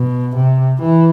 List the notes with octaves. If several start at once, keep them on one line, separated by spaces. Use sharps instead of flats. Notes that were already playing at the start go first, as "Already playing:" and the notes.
Already playing: B2
C3
E3